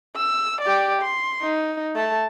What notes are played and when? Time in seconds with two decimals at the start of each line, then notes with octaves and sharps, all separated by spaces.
0.16 E6
0.61 G4 D5
1.02 C6
1.42 D#4
1.95 A3 A5